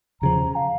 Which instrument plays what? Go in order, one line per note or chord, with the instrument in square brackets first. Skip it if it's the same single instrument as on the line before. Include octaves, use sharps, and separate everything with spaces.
[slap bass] E2 C#3 F3 [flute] A#5
[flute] F5